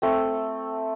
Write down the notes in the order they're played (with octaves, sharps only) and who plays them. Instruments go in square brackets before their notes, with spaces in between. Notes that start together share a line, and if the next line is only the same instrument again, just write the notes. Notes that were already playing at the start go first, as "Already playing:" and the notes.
[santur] A3 C4